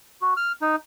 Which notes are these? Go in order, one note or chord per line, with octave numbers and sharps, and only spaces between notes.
F#4
F6
D#4